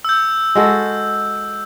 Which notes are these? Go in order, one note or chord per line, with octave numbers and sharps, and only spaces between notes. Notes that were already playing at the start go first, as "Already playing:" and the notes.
E6 G6
G#3 F#4 A4